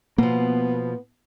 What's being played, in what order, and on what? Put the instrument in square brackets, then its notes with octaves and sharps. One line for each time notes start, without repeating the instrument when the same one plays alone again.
[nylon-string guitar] B2 F3 [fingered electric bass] A#3 [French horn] B3